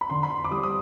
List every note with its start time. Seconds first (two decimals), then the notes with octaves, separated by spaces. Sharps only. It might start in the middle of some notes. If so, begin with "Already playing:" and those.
0.01 B5
0.10 D3 C6
0.23 B5
0.30 C6
0.44 D6
0.51 G3 D#6
0.63 D#6